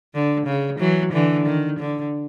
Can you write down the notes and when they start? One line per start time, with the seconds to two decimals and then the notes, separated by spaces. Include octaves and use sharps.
0.14 D3
0.46 C#3
0.79 E3 F#3
1.13 D3 E3
1.46 D#3
1.79 D3